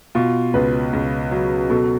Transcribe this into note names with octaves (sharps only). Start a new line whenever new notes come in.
B2 F4
C#2 B4
C#2
F#3
B2 A4